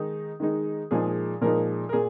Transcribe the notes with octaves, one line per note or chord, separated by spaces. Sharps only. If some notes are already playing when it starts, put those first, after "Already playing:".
Already playing: D#3 G#3 D#4
D#3 G#3 D#4
A#2 F3 G#3 D#4 G#4
A#2 F3 G#3 D#4 A#4
A#4
A#2 G#4